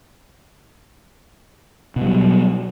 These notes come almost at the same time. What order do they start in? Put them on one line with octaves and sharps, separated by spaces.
B2 G3 F#3